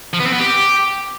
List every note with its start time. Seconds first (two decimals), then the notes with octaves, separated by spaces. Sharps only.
0.13 F3
0.20 B3
0.26 C4
0.33 B3
0.39 G4